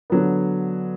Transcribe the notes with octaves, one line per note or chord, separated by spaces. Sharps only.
D3 F#3 B3